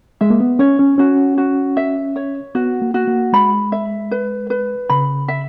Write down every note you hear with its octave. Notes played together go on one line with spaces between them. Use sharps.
G#3 E5
A#3
B3
C#4 C#5
C#4
C#4 F#4
F#4
E5
C#5
B3 F#4
A#3
F#4
A#3
G#3 B5
E5
B4
B4
C#3 B5
E5